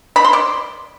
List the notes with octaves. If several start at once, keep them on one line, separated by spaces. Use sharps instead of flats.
B5
C6
D5